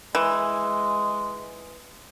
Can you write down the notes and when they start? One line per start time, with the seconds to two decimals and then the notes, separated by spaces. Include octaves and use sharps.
0.15 E3 G#3